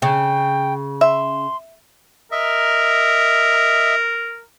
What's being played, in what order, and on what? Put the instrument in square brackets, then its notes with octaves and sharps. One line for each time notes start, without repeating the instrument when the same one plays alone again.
[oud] C#3 [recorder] G5
[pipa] E5 [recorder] C6
[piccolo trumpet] A#4 [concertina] D#5 E5